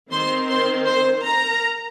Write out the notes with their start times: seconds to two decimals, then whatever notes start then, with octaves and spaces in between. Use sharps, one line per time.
0.12 D#3 C4 C5 C6
0.48 C5 C6
0.86 C5 C6
1.24 A#4 A#5